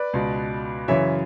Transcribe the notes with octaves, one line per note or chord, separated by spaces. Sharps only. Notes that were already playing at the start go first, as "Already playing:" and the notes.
Already playing: B4 D5
C#2 B2
F#2 C#3 E3 C#5 E5